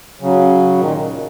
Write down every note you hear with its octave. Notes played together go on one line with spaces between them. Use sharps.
C#3 F#3
A#2 D#3